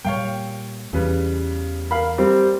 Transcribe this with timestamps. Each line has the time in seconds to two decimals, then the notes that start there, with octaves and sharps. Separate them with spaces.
0.05 A#2 G3 A#3 C#5 F5 G5
0.93 E2 C#3 E3 G3 B4
1.91 A#3 A#4 F5 B5
2.18 G3 C4